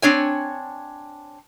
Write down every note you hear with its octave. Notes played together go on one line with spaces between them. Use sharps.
C4 D4 C#5 G#5